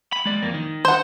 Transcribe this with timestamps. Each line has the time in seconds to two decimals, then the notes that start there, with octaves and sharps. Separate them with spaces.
0.13 B5
0.25 G#3 D5
0.43 F2 A#3
0.54 D#3
0.85 C5 F#5